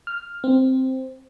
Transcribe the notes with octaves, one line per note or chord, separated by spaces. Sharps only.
F6
C4